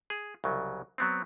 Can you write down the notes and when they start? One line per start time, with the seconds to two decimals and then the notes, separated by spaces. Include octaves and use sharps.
0.10 G#4
0.44 C2 C#3 F#3
0.98 F#3 B3 C4